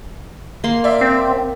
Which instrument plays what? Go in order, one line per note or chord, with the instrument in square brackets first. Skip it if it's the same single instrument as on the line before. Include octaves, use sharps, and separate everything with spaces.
[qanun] A#3 C6
[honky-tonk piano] D5 E5
[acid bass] C4